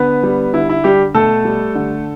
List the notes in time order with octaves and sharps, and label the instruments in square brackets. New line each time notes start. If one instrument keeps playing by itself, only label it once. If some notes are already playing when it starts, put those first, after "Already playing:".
Already playing: [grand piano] D3 B3 B4
G3
D3 E4
E4
G3 G4
B2 A3 A4
G3
D3